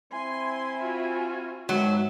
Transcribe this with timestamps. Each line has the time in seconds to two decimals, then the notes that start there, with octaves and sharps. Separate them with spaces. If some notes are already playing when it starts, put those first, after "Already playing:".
0.13 C4 E4 G#5 C6
0.81 F4 F#4
1.69 G#2 B2 D#3 F#3 E5